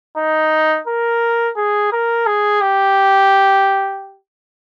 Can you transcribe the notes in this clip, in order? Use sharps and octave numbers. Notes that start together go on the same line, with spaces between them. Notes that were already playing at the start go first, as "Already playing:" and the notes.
D#4
A#4
G#4
A#4
G#4
G4